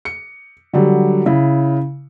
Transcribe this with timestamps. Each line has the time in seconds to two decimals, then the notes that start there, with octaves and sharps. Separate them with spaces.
0.05 C#7
0.73 D3 F#3 G3
1.26 C#3 E4